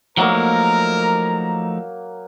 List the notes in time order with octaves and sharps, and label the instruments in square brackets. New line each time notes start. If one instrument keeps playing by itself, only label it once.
[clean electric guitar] F3 A3 D#4 [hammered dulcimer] F#3 A#3 [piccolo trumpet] A#4 [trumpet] A#5